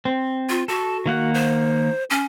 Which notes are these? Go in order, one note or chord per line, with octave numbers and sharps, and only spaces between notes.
C4
F4
F#4 A4
D#3 A#3 F#5
C5
C#4